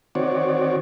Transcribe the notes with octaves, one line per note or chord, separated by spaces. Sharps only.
D#3 C4 F#4 C#5 D5